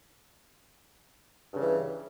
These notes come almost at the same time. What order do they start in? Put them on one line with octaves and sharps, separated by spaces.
G2 C#3 E3